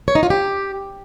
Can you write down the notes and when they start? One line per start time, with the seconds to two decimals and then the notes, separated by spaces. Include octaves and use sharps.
0.08 C#5
0.15 D#4
0.23 F4
0.30 G4